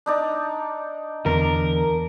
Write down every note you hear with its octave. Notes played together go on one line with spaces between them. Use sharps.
D4 D#4 D5
E2 D3 A#4